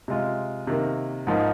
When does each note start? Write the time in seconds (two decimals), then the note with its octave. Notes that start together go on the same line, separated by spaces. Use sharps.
0.08 C3 G#3 F4
0.67 C3 D#3 A#3
1.27 G#2 F3 A#3 D#4